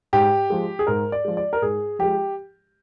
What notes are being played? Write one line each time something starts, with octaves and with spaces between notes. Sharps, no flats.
G#2 G4
F3 G#3
G#4
G#2 A#4
D5
F3 G#3
D5
A#4
G#2 G#4
F3 G#3 G4